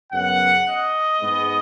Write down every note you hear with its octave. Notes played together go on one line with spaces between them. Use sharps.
F#2 C#3 B3 F#5
D#5
G#2 G#3 B3